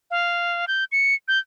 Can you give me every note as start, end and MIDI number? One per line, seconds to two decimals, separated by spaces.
0.11 0.65 77
0.68 0.84 91
0.92 1.15 97
1.28 1.39 91